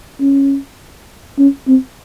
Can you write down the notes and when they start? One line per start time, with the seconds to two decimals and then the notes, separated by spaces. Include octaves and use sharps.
0.20 C#4
1.39 C#4
1.68 C4